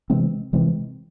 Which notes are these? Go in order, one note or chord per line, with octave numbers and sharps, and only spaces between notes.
C3 E3 G#3 C4
C3 E3 G#3 C4